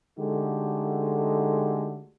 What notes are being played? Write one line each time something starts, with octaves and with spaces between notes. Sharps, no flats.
D3 G#3 A3 D#4 F#4 G4